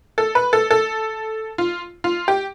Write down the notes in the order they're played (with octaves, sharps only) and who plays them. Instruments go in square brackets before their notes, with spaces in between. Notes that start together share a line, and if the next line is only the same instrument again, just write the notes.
[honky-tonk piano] A4
B4
A4
A4
F4
F4
G4